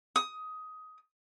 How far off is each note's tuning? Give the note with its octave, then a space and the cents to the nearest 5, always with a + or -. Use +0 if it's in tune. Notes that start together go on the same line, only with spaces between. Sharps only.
D#6 +15